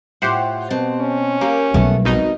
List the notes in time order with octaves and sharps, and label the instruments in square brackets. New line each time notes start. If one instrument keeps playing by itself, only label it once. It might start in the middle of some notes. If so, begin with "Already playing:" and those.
[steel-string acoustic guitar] A2 F4 [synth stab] G4 C5 F#5
[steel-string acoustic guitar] B2 C4 A5
[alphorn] C#4
[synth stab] A#3 [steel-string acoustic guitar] G4
[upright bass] B1 G3 [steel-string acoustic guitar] A3 B3
[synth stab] G#1 B2 D#4 [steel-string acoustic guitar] A#4 D#5